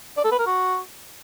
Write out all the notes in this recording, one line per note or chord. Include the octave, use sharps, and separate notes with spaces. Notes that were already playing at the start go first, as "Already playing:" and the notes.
D5
A4
B4
A#4
F#4